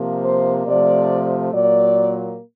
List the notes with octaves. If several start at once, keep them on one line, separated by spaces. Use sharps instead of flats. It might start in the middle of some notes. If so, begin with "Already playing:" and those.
Already playing: C3 F3 A#3
C5
C3 F3 A3 D5
A#2 F#3 A#3 D5